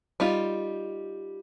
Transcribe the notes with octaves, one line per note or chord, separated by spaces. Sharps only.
G3 D#4 F4